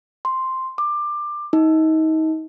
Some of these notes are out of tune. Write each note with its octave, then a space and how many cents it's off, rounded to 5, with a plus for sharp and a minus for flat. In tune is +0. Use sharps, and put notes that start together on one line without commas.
C6 +0
D6 +20
D#4 +30